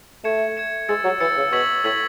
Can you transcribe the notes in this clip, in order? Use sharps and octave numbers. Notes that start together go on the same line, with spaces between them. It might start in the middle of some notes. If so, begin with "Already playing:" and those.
A3 G#6 C#7 E7
G#6 C#7 E7
G#3 E6 A6 C#7
F#3
E3 E6 A6 C#7
C#3
B2 C#6 E6 G#6 B6 F#7
A2 C#6 E6 G#6 B6 F#7